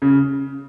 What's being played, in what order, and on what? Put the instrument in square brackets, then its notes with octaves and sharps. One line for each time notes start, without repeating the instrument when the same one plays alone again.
[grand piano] C#3